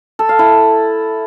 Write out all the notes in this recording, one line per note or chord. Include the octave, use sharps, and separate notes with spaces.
A4
F5
E4